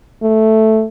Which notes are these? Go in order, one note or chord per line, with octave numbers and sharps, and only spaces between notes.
A3